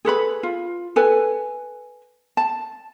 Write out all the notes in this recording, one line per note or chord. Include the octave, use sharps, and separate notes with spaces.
G#4 A4 B4 B5
F4
A4 B4 G#5
A5